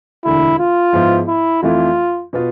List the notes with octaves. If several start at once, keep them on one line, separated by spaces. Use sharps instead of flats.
E1 D2 D3 E4
F4
G#2 F3 B3 E4
E4
F2 E3 A3 E4 F4
B2 B3 F4